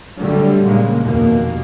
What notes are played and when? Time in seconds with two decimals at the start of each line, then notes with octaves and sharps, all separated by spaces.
0.19 D3 F#3 G3 A3
0.64 A#2 C#3 G#3 A#3
1.04 F1 D#2 B2 A#3